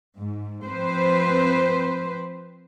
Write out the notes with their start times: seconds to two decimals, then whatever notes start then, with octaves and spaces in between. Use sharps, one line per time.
0.18 G#2
0.65 F3 C4 B4 C5